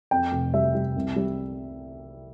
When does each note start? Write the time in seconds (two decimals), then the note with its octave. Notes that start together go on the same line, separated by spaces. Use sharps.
0.11 F2 G5
0.32 F1
0.54 G3 E5
0.75 G3
0.96 C2
1.16 G3